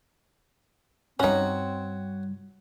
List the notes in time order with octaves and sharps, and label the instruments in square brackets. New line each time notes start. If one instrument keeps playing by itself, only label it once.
[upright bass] G2 G3 [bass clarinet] C4 [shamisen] C#4 D#4 [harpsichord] F#4 C#5